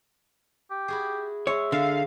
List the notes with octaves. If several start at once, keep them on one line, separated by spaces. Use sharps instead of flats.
G4
E4 F#4 G#4
G#3 C#5 E5
D3 F5